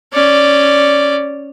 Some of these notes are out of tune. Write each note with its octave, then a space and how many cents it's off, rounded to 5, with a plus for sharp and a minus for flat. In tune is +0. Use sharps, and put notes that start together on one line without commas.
C#4 +0 D5 +0